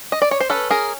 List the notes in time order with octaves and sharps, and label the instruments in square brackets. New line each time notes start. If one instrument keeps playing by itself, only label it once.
[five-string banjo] D#5
D5
C#5
C5
C#4 A4 B4
G#4 A#4